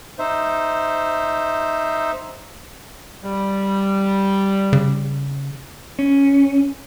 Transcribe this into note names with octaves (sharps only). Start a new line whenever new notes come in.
D#4 C5 E5
G3
C#3
C#4